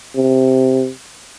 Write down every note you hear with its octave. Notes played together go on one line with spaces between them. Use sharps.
C3